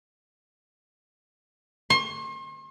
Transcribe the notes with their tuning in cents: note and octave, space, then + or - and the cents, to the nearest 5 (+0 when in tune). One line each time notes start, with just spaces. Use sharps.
C6 +40